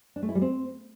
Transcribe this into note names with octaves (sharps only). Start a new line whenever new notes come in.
D4
A3
E4
G3
C4